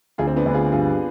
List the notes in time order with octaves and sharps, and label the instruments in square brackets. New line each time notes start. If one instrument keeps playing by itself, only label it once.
[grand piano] D2 [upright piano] F4 G#4
[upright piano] C4
B3 D4
[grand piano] D2 [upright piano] B4
[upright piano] F4 G#4
[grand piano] G2 [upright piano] F4 G#4